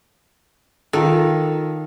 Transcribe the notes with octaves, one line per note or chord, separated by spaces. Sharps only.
D#3 F4 A4